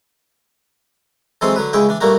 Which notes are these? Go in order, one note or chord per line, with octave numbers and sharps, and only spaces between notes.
E3 F#3 G#3 C4 A4 C6
D3 F#3 B4
C#2 C#3 G#3 E4 G5
E3 D4
G2 A#2 G3 A3 A#3 F#4